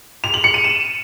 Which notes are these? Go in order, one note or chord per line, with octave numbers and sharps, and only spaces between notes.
F7
F#7
C#7
D#7
E7